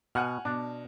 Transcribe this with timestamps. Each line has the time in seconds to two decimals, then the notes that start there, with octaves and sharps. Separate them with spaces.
0.15 B2 F#5 G#5 F6
0.45 B2 D4